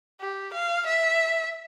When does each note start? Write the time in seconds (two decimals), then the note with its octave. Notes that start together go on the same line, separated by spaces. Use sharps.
0.21 G4
0.54 F5
0.86 E5